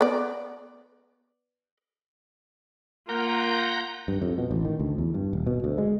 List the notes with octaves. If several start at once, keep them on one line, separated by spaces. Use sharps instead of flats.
B3 D5
A#3 F4 A#4 F#5 A#5 G6
G2
F2
B2
A1
D#3
D2
E2
G2
D#1
B2
D2
G#3